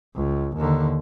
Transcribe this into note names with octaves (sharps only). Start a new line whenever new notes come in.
C#2
D#2 D3